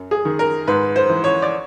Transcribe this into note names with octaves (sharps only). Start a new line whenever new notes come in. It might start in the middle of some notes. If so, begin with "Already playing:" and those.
Already playing: F#2
G#4
D#3
A#4
G#2 B4
C5
E3
C#5
D5